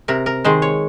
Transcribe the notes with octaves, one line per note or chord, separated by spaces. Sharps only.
C3 A#4
A#4
D#3 G#3 C5
C#5